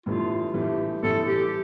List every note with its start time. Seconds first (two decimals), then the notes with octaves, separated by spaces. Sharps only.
0.06 A1 G2 E3 A3 F4
0.54 A1 G2 E3 A3 G4
1.03 A1 G2 E3 A3 A4
1.26 G4